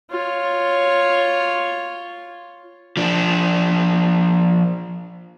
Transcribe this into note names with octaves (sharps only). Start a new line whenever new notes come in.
F4 C#5
F3 D4